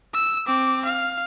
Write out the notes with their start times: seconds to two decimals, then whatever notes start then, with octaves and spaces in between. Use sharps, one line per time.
0.14 E6
0.47 C4 D6
0.85 F5